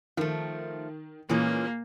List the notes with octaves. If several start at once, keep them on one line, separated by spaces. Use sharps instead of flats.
D#3 F3 A3
A#2 E3 G#3 A#3 C#4